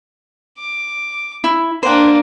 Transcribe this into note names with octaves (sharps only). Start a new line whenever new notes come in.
D6
E4
A#3 D4 C5 F#5 G5